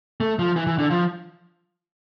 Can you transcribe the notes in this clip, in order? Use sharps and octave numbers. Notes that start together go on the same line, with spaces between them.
A3
F3
E3
E3
D3
F3